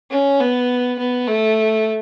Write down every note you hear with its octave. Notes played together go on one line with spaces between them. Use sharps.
C#4
B3
B3
A3